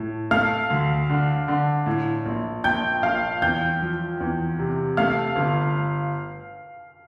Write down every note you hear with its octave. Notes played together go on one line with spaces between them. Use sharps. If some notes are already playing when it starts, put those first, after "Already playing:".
Already playing: A2
A3 F5 F6
D2
D3
D3
A2
A#1
A#1 G5 G6
A#1 F5 F6
E2 G5 G6
F3
E2
C3
A3 F5 F6
G1